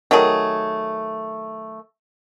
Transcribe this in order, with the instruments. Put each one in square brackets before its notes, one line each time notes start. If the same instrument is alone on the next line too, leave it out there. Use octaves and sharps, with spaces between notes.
[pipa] D#3 F#3 A3 G#4